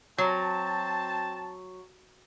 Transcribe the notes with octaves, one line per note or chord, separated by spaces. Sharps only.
F#3 C4 A5